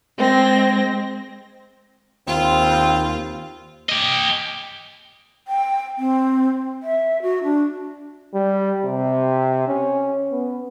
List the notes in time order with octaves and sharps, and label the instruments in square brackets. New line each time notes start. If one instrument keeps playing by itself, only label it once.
[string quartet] G#3 C4 A#6
[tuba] D#2 [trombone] C4 [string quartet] F4
[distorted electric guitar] G4 D#5
[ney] G5
C4
E5
F#4
D4
[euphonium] G3
C3
C#4
B3